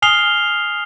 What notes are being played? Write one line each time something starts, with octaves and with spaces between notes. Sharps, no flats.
G#5 D#6 F6 C7 F7 G7